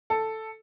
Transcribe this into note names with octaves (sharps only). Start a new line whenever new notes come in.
A4